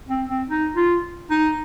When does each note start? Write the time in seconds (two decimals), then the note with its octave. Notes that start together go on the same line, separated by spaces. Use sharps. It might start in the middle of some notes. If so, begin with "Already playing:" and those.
0.08 C4
0.29 C4
0.48 D#4
0.76 F4
1.30 D#4